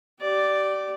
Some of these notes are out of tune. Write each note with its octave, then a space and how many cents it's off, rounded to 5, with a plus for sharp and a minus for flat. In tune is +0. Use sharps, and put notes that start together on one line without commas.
G4 -30 D5 +0